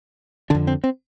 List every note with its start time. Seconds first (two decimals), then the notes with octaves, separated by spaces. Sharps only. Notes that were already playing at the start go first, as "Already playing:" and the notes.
0.50 F2 D3 D4
0.67 C4
0.84 C4